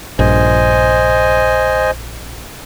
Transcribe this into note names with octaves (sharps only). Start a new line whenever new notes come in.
A#1 G2 C5 D#5 G#5